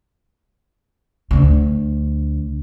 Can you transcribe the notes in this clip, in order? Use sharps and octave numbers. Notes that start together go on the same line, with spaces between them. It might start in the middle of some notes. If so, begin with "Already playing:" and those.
D2 D3